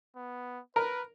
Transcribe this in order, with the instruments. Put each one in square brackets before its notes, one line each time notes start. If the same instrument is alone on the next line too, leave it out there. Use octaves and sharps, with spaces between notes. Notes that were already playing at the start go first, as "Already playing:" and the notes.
[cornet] B3
[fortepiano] A#4 [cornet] B4